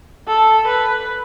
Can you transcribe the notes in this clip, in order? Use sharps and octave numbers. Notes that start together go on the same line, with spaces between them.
A4
B4